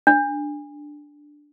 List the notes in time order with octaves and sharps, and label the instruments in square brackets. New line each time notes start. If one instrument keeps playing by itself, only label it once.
[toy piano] D4